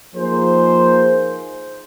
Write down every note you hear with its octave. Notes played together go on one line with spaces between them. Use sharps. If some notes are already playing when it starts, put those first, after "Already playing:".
F3 A#3 D#4 G#4 C5